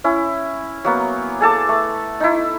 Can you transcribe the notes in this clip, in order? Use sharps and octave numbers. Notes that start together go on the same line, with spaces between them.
C#4 E4
F#3 A#3 B3
G#4 A4 A5 D6
A3
D#4 E4